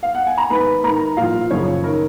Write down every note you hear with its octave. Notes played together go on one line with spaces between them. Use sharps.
F5
F#5
G#5
A#5
G#2 D#3 B4 B5
G#2 D#3 A#4 A#5
A#2 F3 F4 F5
F#2 C#3 F3 C#4 C#5
D#3 A#4